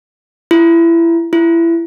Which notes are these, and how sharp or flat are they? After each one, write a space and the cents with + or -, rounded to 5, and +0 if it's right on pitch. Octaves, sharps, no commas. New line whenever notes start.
E4 +25
E4 +25